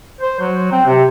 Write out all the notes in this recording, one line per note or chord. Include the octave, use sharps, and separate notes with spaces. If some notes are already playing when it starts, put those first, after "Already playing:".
C5
F#3
C4
C3